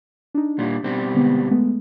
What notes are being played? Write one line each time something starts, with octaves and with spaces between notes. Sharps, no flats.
D4 D#4
A#2 G3
B2 G3 C4
D3 G#3 B3
G#3 A3 B3